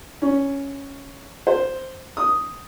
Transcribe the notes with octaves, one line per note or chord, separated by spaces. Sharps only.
C#4
C5
D#6